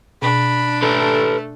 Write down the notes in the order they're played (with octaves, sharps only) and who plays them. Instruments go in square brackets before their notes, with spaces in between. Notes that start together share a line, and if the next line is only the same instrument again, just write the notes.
[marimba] B2 [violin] D4 [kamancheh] B5
[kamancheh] A3 [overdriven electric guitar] A4 B4